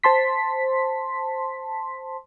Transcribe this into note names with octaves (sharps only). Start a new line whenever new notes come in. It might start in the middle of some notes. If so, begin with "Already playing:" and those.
C5 A5 C6 B6